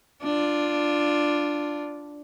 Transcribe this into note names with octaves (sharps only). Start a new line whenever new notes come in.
D4 F4